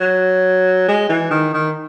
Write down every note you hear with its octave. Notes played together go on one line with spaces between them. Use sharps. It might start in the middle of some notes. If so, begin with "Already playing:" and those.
F#3
G#3
E3
D#3
D#3